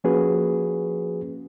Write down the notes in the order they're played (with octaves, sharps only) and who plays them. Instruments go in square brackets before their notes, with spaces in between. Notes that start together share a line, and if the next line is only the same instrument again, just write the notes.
[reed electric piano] F3 A#3 C#4 F#4 G#4 B4